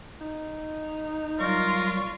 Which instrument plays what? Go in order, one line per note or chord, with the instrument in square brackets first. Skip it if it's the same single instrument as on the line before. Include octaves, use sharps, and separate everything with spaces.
[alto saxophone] D#4
[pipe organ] F#3 G3 C#6 [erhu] F4 [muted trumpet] A#4